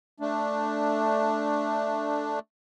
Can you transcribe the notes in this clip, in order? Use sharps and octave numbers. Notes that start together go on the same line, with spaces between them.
A3 D4